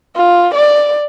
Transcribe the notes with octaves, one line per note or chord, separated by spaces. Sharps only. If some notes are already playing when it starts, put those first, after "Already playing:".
F4
D5